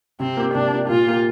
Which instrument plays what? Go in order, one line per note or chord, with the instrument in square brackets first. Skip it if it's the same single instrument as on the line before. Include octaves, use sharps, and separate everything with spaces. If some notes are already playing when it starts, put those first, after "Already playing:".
[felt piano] C3 [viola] C4
[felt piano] A#3 G4
[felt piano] C3 [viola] D4
[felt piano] A#3 G4
[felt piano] A#2 [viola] F4
[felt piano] A#3 G4